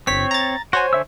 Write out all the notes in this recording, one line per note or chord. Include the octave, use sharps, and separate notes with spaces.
G1 C4 C#5 B6
A#5 A6
F#4 C5 C#5 G#5
D3 E5 E6